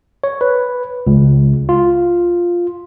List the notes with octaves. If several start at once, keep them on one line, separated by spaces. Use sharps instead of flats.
C#5
B4
C#2
F4